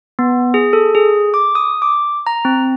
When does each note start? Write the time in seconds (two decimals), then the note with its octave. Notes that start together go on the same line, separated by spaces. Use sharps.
0.19 B3
0.54 G#4
0.73 A4
0.95 G#4
1.34 D6
1.55 D#6
1.82 D6
2.27 A#5
2.45 C4